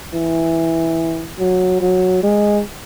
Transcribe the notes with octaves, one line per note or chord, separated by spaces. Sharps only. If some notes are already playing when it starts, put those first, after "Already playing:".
E3
F#3
F#3
G#3